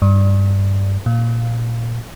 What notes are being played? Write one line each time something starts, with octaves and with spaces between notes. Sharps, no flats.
G2
A#2